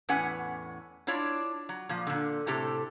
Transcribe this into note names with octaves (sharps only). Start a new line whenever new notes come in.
E2 A2 C#4 B4 F#5 G#5
D4 E4 F4 C#5 D5
F#3
A#2 F3
A#2 D3
A2 C3 G4 A4